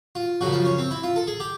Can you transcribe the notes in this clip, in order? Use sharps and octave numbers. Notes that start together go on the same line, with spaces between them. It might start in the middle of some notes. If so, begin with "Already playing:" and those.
F4
F#2 C#3 F3 F#4
F4
C#4
C4
E4
F4
A4
G#4
G4